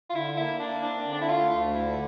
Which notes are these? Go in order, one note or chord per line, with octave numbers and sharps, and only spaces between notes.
F4
D3 E4
A#3 E4
A#3 D4
C4 D4
D3
D4
E4
A3 F4
D2
D3 E4